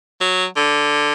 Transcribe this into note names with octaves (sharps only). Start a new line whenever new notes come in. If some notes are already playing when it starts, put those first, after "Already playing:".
F#3
D3